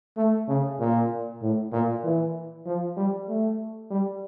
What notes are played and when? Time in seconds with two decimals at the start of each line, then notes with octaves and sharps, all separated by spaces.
0.17 A3
0.48 C#3
0.79 A#2
1.42 A2
1.72 A#2
2.03 E3
2.66 F3
2.96 G3
3.28 A3
3.90 G3